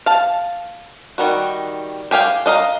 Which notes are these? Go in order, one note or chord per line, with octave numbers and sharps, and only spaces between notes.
F5 A5
D#3 G3 F#4
G4 G#4 F5 G5
D4 D#5 F5 A#5